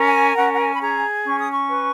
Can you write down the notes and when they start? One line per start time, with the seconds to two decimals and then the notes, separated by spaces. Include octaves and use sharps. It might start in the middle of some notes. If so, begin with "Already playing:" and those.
Already playing: C#4 A#4
0.08 G#5
0.37 C#4 F#5
0.54 F#5
0.59 G#5
0.74 B5
0.81 G#4 A#5
1.25 C#4 C#6
1.39 D#6
1.51 C#6
1.69 B4